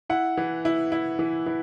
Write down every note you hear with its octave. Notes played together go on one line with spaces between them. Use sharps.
E4 F#5
E3
E4
E4
E3
E3